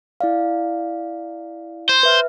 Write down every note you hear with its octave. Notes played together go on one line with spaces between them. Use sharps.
E4 D5 F5
C5
B4 E5 F6